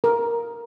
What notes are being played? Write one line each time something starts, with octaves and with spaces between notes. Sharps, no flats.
A#4